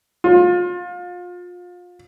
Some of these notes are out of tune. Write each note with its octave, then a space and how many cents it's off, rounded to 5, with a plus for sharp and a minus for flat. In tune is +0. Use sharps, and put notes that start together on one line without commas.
F4 +30